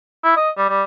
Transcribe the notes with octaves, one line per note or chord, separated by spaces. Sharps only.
E4
D#5
G3
G3